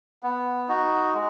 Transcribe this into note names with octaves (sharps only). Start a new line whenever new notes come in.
B3
D#4 F#4
G#3